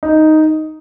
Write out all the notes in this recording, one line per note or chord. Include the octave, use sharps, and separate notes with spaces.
D#4